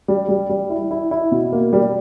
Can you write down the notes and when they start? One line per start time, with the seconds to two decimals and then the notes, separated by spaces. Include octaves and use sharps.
0.08 G3
0.29 G3
0.49 G3
0.70 E4
0.91 E4
1.11 E4
1.31 B2
1.52 A#3
1.73 G3